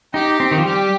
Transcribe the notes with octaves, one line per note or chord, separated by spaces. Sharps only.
D#4 G4
C4
D#3
F3
G3 G4